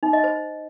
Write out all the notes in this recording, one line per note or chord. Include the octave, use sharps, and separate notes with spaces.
D#4
D#5
C5